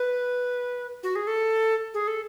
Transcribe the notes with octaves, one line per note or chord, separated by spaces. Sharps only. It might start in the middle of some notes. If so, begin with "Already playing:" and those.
Already playing: B4
F#4
G#4
A4
G#4
A4